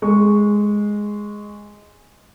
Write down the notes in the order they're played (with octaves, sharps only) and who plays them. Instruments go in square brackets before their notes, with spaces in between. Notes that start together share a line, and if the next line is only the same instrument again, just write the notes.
[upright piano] G#3 C#6